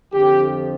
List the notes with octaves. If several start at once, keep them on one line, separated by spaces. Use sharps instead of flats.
F2 D3 F3 G4